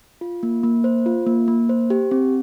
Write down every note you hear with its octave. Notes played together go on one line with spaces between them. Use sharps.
F4
A#3
A#3
C5
F4
A#3
A#3
C5
G4
C4